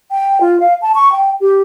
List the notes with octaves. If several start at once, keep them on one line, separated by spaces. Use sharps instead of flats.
G5
F4
F5
A5
C#6
G5
G4